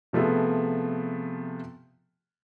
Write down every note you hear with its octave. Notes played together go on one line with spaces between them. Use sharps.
C3 F3 A3 B3 G#4